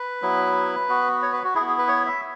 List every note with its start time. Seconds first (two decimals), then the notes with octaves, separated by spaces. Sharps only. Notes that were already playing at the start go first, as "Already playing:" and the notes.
Already playing: B4
0.22 F#3 B3 E4
0.89 B3 F#4
1.23 C#5
1.33 B4
1.44 F#4
1.55 E4 G#4
1.60 B3
1.67 G#4
1.78 B4
1.88 C#5
2.06 E5